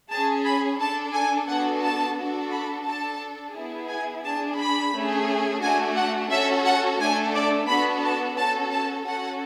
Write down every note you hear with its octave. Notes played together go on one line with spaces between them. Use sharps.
C#4 G#4 A5
B5
D4 A4 A5
G#5
B3 D4 F#4 A4 F#5
A5
D4 F#4 A4
B5
D4 A4 A5
B3 E4 G#4
G#5
D4 G#4 A5
B5
A3 C#4 G#4
A3 D4 F#4 G#5
F#5
C#4 F#4 A4 E5
F#5
A3 D4 A4 G#5
D5
B3 D4 F#4 A4 B5
A5
C#4 F#4 A4 A5
A5
C#4 F#4 A4 F#5